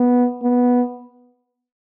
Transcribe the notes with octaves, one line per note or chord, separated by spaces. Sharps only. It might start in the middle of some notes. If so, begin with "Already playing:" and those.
Already playing: B3
B3